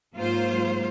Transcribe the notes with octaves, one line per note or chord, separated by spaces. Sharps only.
G#2 F#3 A#3 F4 C5